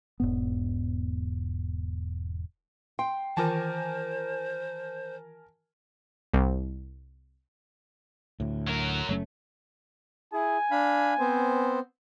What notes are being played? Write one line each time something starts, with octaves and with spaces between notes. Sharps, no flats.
E1 G#2 B3
G5 C6
D#3 E3 F4 A#4 C5 G#5 A5
C2
D2 A2
F#3 A#4
F#1 A3 C#4
E4 G#4 G#5
D4 F5 B5
B3 C4 C5